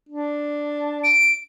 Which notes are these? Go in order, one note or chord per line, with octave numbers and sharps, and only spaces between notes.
D4
D7